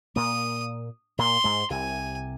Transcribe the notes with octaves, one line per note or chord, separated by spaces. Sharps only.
A#2 A#3 D#6
A#2 A#3 C6
G#2 G#3
C2 C3 G#5